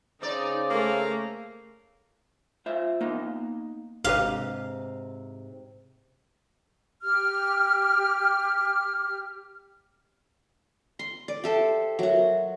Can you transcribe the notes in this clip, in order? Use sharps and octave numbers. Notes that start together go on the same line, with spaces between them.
C#3 C4 D#4 D5
A3 A#3 G#4
F4 C5 E5
A#3 B3 D#4
G#1 G#2 C3 G4 B4 F5
G4 F6
C6
D5
G4 A4 C5 E5
F#3 F#4 A#4 E5